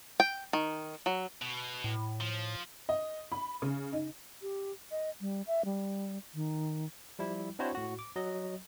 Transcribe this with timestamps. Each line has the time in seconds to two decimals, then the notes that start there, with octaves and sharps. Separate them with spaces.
0.20 G5
0.53 D#3
1.06 F#3
1.42 B2
1.84 A2
2.21 F3
2.89 D#5
3.32 B5
3.62 C#3
3.93 D#4
4.42 G4
4.91 D#5
5.21 G3
5.47 E5
5.65 G3
6.34 D#3
7.19 F3 G3 E4
7.59 C4 D4 E4 F#4 C5 C#5
7.75 A2 F#4
7.99 D6
8.16 F#3 D#5